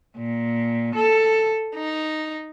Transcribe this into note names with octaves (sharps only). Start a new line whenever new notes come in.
A#2
A4
D#4